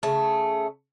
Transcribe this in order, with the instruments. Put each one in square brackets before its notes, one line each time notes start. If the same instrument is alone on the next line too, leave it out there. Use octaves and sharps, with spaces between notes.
[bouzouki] C#3 A3